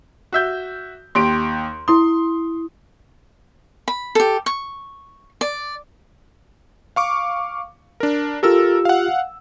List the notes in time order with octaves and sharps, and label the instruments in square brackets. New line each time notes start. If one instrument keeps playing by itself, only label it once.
[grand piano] F#4 E5 G6
[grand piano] D#2 G4 D7 [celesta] C6
[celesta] E4 D#6 [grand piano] C6
[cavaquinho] B5
G4 A4
C#6
D5
[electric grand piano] F5 C#6 D6
D4 A#4
[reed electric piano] F4 G4 [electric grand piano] A4 A#4 E6
[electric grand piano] F5 F#5